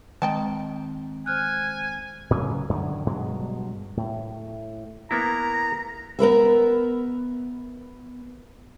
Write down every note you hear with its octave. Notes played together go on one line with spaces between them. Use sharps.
D#3 G#3 C4 D#5 G5 A5
C5 G#5 F6 F#6
A2 C#3 F#3 G3
F#2 D3 D#3
G2 B2 F#3 G#3
A2
A#3 B3 E4 A#5
B3 A#4 B4 E5